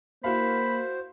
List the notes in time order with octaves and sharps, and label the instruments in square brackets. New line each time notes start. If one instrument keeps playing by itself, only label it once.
[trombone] A#3 [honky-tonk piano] E4 F#4 F5 [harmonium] C5 [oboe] B5